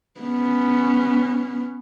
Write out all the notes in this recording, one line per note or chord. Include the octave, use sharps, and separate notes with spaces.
B3 C#4